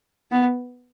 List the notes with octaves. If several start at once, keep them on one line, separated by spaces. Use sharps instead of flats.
B3